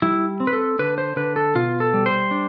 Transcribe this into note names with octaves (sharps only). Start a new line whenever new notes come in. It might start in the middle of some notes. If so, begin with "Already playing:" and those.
G3 E4
C4
B4
A4
D3 B4
C5
D3 B4
A4
B2 F4
A4
G3
C5
D4